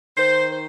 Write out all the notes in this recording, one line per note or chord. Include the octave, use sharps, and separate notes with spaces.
D#3 C5
C5